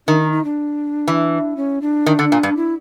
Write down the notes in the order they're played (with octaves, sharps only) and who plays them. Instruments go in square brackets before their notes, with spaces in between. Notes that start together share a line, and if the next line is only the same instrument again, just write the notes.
[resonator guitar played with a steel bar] D#3 [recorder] D4
[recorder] D#4
D#4
D4
[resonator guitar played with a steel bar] E3
[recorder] C#4
D4
[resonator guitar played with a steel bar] D#3
D3
A#2
G2
[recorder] E4